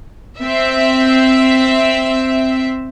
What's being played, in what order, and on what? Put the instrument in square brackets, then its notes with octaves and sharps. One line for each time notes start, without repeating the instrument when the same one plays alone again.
[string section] C4 E5